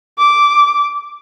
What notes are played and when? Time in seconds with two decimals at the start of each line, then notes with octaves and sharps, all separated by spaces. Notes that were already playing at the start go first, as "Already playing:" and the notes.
0.19 D6